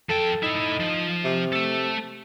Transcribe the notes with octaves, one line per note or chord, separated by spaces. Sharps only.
F3 A4 G5
D#4 E4 A4
F3
C3
A3 A4